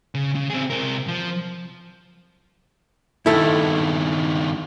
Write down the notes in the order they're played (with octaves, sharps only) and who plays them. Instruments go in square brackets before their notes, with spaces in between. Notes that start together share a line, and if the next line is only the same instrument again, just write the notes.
[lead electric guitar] C#3
C#3
C4 G#4
C3 A#4
F3
[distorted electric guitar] G2 D#3 [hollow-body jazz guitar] E4 A4